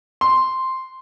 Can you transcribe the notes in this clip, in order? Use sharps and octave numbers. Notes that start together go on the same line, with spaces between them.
C6